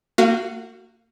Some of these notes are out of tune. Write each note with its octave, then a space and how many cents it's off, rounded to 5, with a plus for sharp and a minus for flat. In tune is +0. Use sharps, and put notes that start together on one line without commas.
A#3 -40 F#4 +0 F5 +0